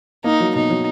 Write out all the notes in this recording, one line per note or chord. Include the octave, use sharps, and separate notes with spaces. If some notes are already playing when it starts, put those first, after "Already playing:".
A#3 D#4
F#3
B2 D#4
F#3